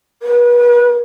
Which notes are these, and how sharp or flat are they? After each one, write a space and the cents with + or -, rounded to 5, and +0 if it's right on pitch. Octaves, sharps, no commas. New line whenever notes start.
B4 -40